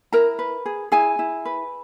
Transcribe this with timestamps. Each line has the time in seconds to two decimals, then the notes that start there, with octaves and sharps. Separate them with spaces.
0.12 E4 A#4 A#5
0.39 B4
0.66 G#4
0.92 E4 G#4 G#5
1.19 E4
1.45 B4